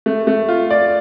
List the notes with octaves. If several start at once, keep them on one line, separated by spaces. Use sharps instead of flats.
A3
A3
F4
D5